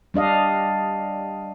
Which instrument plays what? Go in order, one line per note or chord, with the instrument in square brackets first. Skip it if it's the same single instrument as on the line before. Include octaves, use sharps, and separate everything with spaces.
[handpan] G3 D4 D#5 F5